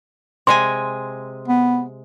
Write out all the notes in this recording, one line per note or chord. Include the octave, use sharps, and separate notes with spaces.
C3 G#3 G#5 C6
B3